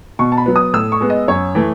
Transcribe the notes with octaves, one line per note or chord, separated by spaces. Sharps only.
B2 C#6
A5
B5
F#3 B3
D#6
A2 E6
C#6
G#3 B3
D#5
F#2 C#5
E3 A3